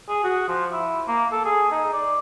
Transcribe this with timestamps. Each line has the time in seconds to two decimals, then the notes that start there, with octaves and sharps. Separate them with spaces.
0.09 G#4
0.24 F#4
0.48 F3
0.72 E4
1.08 A#3
1.32 A4
1.46 G#4
1.71 D#4
1.93 D5